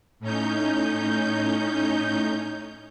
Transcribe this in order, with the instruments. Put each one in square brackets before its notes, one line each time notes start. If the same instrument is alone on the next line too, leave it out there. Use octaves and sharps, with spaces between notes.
[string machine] A2 C#4 D#4 G6